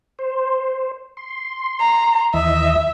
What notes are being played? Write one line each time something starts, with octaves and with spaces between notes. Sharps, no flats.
C5
C6
A#5
D#2 E3 D#5 E5